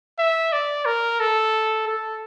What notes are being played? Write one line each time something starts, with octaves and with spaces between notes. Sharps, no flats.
E5
D5
A#4
A4
A4